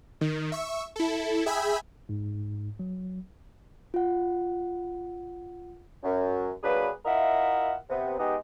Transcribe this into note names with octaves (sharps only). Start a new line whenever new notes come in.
D#3
E5 C#6
E4 A4
G#4 E5 G5 G#5 B5
G#2
F#3
F4 F#5
F#2
F#3 A#3 D4 G#4 B4
E4 F4 A#4 D#5 E5 F#5
C3 B3
G#3 B3 D#4 G4